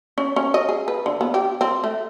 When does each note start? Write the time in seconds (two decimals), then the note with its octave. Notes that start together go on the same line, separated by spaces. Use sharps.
0.18 C#4
0.36 C#4
0.54 D#5
0.69 G#4
0.88 B4
1.06 D3
1.21 B3
1.34 G4
1.61 C4
1.84 A3